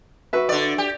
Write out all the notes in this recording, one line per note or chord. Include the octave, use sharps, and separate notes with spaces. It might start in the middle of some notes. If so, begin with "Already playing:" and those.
F#4 B4 E5
D3 D5
G4